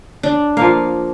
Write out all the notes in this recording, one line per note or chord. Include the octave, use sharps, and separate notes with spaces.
D4
F3 A#3 F5